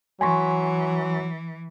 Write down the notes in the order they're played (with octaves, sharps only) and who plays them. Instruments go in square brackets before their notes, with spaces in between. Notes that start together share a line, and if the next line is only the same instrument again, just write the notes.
[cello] E3 [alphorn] F#3 [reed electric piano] G#5 C6 C#6